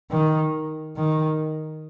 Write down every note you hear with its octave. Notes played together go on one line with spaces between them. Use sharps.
D#3
D#3